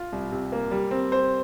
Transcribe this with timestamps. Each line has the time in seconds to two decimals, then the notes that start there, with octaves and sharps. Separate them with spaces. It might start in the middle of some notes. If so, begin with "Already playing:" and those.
Already playing: F4
0.12 C2
0.32 C3
0.52 A#3
0.71 G3
0.91 C4
1.12 C5